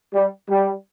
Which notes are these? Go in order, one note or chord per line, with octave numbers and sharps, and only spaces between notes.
G3
G3